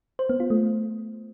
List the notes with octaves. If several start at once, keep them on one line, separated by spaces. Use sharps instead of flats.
C5
B3
F4
A3